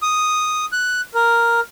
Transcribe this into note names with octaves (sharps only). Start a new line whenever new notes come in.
D#6
F#6
A#4